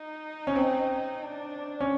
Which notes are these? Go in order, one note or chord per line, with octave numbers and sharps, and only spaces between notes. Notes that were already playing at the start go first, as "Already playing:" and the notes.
Already playing: D#4
C#4
C4
D4
C#4